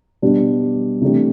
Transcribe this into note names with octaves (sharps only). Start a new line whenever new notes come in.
B2 G3 D4
C3 E3 A3 D4 G4